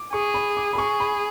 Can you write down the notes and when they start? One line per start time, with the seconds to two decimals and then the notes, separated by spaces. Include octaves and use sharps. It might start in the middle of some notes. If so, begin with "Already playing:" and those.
Already playing: D6
0.13 G#4 C#6
0.34 B5
0.57 D6
0.73 B5
0.78 G#4 C#6
1.00 B5